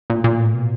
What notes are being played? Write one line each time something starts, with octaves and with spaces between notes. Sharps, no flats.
A#2
A#2
A2
B2